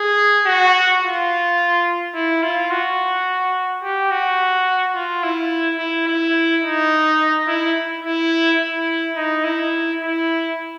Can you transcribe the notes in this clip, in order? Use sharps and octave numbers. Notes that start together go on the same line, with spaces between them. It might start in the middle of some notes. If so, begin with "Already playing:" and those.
Already playing: G#4
F#4
F4
E4
F4
F#4
G4
F#4
F4
E4
E4
E4
D#4
E4
E4
E4
D#4
E4
E4